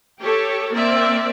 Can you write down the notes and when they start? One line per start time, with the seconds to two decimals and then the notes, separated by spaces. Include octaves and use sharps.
0.19 G4 A4 C#5
0.74 A#3 C4 A#4 D5 E5